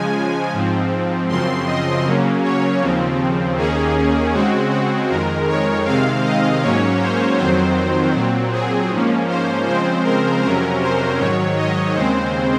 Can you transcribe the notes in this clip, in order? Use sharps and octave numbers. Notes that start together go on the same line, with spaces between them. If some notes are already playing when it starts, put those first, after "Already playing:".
Already playing: C#3 F3 G#3 G#5
G#2 F3 C4
F#2 C#3 F3 C4 C6
D#5
C#3 F#3 A#3 C#4
C#5
D#2 C#3 F3 C4
D#2 D#3 A#3 C#4 G#4
C#3 G#3 C4 F#4
F#4
F2 D#3 G#3 A#4
C#5
C3 D#3 G#3 C4 F5
D#5
G#2 F#3 A#3 C#4 C#5
C5
F2 D#3 F#3 C4 C5
A#2 F#3 C4
G#4
G#2 F3 A#3 C#4
C5
C#3 F3 G#3 C4 C5
A#4
F2 C3 F#3 C#4 A#4
C5
G#2 D#3 F#3 C#5
D#5
D#2 C#3 G#3 C4 C5